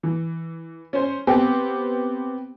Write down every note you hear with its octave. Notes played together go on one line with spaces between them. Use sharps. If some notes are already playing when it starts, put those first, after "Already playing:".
E3
C#4 C5
B3 C4 G4